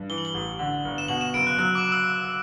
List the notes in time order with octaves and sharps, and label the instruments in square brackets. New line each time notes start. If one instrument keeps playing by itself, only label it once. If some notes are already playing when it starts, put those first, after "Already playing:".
Already playing: [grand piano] G2
[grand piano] E3 [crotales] G7
[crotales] F#7
G7
[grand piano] A1
D3
G1
[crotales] E7
[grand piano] B2 [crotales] F#7
[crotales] E7
[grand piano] F#1 [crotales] D7
[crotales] F#6
[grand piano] F#3 [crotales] F#6
[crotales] D6
E6